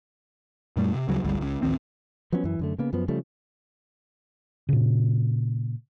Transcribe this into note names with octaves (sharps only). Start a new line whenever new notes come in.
F#2 A#2 G3 A3
C3
D2 C#3 F#3 G3
G1 C#2 D3 G3
C#2 C#3
A1 D2 D#3 C4
F3 F#3 B3 C#4
F#2 E3
F#2 D3 A3
C#3 A#3 B3
F#2 F3 B3
C#3 F3 G3 A3
A#2 C#3